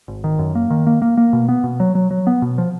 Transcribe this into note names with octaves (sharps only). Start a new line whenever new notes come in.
G#1
D#3
F#2
A#3
D#3
A#3
A#3
A#3
B2
B3
B2
F#3
F#3
F#3
B3
B2
F3